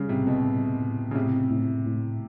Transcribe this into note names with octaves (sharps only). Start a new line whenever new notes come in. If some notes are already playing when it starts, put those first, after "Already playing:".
Already playing: C#3 G3
A2 C3
B2
A2
A2
C#3
A2 C3
A2
A2